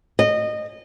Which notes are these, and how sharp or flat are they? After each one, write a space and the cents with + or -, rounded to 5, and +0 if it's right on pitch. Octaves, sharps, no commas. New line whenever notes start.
D#5 -20